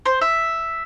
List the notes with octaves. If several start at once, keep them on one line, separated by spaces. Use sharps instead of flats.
C5
E5